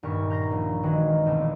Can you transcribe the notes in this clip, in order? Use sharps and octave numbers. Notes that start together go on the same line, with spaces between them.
D#1 G2 A#4 C#6 B6
A#5 G6 A#6 C7
A#1
D#3 E3 G#3 F#4
E1 D2 B2 C4